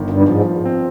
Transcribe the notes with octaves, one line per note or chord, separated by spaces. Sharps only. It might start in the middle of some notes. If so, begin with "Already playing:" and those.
Already playing: G1 D#3
G2
G#2 F3
C4